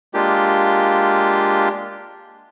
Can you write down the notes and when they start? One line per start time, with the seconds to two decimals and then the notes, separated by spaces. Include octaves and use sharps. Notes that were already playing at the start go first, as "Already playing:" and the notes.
0.14 G#3 A#3 D4 F4 G4